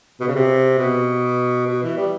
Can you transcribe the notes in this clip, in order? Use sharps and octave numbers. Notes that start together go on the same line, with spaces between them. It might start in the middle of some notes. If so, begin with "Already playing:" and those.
B2
C#3
C3
B2
B2
E3
G3